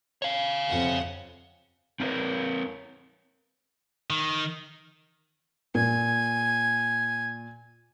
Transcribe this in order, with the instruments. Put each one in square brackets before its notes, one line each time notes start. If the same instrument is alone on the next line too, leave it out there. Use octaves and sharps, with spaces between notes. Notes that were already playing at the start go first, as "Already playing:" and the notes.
[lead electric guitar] C#5 F5
[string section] F2 C3 F#5
[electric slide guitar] C4 E4 F4 A#4 B4 C#5
[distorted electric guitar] D#3
[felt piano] A#2 [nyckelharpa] G#5